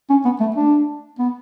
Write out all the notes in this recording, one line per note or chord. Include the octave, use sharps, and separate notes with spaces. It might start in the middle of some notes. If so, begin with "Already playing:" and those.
C#4
B3
A3
D4
B3